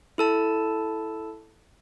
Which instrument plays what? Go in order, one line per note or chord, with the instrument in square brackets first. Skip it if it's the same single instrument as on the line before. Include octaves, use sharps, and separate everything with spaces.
[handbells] E4 A4 A5